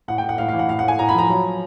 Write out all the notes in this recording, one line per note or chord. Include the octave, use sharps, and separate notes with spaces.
A2 F#5
G5
A2
F#5
A2 F5
F5
E3
F#5
A2 F5
F#5
A2 G#5
A2 A#5
B5
F3 A#5
F#3